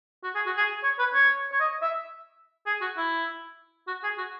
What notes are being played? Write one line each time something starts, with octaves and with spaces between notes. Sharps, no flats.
F#4
G#4
F#4
G#4
C#5
B4
C#5
C#5
D#5
E5
G#4
F#4
E4
F#4
G#4
F#4